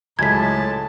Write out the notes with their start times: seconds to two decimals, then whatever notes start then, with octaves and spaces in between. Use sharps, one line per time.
0.19 C#2 A2 F#3 G#3 A5 G#6 B6